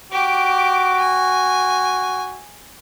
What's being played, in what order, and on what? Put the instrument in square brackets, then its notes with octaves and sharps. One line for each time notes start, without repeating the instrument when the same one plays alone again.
[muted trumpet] F#4 [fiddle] G4 D6
[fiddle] G#5